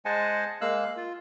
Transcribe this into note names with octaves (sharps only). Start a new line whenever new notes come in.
G#3 C5 D#5 F#5 G#5 A5
G#3 A#3 F5 E6 F#6
F4